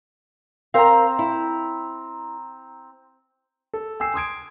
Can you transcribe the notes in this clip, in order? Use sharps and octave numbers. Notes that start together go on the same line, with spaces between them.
C4 A#4 F5 A#5
E4
A4
G5 G#5 E6 C7
C6 D#6 G#6 D7